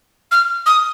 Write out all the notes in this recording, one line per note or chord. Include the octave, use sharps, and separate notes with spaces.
F6
D#6